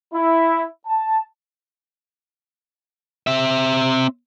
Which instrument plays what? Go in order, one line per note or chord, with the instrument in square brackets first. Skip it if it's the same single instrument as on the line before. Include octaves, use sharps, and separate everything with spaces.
[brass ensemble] E4
A5
[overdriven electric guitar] C4 E5